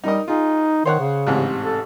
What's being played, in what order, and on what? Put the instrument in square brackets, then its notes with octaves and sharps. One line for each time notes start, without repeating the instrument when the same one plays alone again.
[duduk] G3 [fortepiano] D#4 A#4 D#5
[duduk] D#4 [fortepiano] F4 G#4
[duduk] D#3 [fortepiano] C5 C#5 F#5
[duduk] C#3
[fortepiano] A1 G#2 C3
[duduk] A4